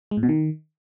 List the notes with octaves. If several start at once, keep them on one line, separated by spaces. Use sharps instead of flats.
G#3
A2
B2
D#3